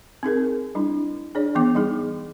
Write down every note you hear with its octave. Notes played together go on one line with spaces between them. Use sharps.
C4 D#4 G#4 A#4
G3 D4 E4
D4 G#4 C#5 D5
E3 B3 D6
G3 D#4 G#4